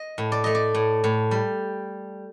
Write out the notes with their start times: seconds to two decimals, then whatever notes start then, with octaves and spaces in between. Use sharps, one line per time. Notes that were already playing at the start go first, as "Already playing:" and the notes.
Already playing: D#5
0.18 A2
0.32 D5
0.44 A3 D#5
0.55 D5
0.74 A2
1.04 A2
1.31 G3